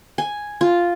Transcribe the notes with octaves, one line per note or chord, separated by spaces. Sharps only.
G#5
F4